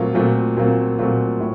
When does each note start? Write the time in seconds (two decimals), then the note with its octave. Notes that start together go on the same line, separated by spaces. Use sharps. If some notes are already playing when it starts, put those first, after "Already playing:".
Already playing: A#2 F#3 A3 C4 F4
0.15 A#2 F#3 A3 C4 F4
0.57 A#2 F#3 A3 C4 F4
0.98 A#2 F#3 A3 C4 F4
1.40 A2